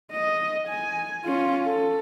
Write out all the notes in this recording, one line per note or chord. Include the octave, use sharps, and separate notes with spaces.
D#5
G#5
C#4 F4
A4